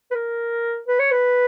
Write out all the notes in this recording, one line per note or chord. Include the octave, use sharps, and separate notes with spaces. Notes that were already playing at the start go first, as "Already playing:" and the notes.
B4
A#4
B4
C#5
B4